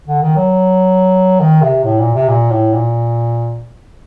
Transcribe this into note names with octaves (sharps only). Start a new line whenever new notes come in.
D3
D#3
F#3
D#3
C3
A2
A#2
C3
A#2
A2
A#2